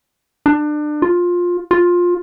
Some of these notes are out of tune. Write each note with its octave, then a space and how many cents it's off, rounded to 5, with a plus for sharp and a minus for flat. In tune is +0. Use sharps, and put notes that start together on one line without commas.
D4 +30
F4 +15
F4 +15